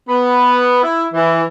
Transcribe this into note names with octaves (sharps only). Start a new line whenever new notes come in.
B3
E4
E3